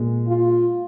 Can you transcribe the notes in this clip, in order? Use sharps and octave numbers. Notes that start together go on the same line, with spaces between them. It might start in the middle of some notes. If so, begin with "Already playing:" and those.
Already playing: A#2 G#3
F4